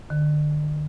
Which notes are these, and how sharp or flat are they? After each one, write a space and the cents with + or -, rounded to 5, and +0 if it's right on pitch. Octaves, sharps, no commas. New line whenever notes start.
D3 +35